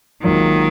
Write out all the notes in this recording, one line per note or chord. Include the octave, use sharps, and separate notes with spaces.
G#1 G#2 D#3 F#3 A#3 F4